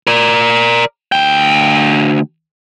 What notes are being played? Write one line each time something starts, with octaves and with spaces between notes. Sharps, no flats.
A#4 D5
D2 G5